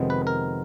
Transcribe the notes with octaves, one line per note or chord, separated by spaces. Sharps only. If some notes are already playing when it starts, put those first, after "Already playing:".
Already playing: F2 C3 D#3 G#3 B3
B4
A#4